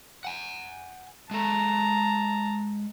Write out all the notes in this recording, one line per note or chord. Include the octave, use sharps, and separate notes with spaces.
F#5 G#5
G#3 A4 A5 A#5